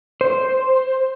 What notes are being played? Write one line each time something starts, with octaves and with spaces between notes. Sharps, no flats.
C5